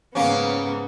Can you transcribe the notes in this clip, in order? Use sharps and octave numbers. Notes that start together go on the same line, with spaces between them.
G#2 C#3 A#3 B3 C#4